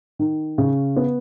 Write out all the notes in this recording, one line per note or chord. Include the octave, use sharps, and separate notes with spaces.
D#3
C#3
B3